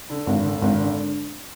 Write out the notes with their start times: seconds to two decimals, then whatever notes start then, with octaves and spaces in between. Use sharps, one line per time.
0.10 D3
0.27 G#1
0.44 D3
0.62 G#1
0.79 D3